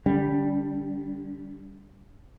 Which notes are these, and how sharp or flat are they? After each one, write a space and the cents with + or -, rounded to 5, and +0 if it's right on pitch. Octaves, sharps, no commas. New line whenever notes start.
D3 +0 G3 +0 C#4 +45